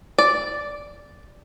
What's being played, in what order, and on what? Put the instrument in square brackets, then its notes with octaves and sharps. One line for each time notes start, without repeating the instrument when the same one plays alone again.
[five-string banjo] D5